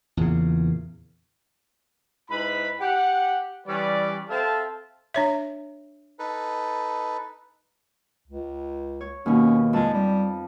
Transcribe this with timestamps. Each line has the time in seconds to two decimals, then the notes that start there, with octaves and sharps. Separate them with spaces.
0.17 E2 A#2 C#3
2.30 G#2 E4 B4 B5
2.80 G4 F#5
3.66 E3 G3 C#4 B4 D5
4.29 C4 A4 E5 F5 A5
5.14 D4 C#5 E5
6.19 D#4 A4 B4
8.27 C#2
9.01 C#5
9.26 D#2 B2 C#4
9.73 F2 G#3 C4 A5
9.93 G3